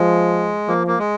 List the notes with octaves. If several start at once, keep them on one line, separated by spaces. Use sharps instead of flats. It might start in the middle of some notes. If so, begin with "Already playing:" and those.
Already playing: F3 G#3
F3 A#3
A#3
G#3